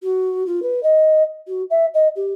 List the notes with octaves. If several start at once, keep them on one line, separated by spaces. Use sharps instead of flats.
F#4
F4
B4
D#5
F#4
E5
D#5
G4